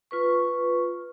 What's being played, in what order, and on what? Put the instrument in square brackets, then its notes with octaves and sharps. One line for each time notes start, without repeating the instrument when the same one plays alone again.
[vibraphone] F4 B4 C#6